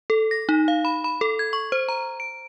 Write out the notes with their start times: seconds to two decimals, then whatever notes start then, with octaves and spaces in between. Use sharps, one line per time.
0.10 A4
0.31 A#6
0.49 D#4
0.68 F5
0.85 B5
1.04 B5
1.21 A4
1.39 G#6
1.53 C#6
1.72 C5
1.89 A#5
2.20 D7